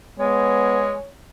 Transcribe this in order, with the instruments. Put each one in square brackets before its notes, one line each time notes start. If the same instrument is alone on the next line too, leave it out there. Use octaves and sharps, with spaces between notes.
[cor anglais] G#3 [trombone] B3 [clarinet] C#5